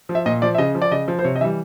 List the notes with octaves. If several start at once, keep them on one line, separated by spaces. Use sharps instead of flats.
F3
E5
A#2 D#5
F3 D5
E5
C#3 D#5
F3
D5
C#3 D#5
F3
C5
C3 C#5
D#5
E3 G3 E5